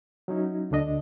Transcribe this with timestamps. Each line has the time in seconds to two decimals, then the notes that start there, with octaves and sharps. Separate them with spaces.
0.28 F#3 C#4 D#4 E4
0.71 D2 D3 D4 D#5